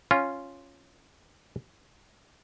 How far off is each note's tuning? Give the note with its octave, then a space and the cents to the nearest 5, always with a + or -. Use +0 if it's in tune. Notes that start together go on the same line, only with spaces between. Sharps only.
C#4 +0 F4 +0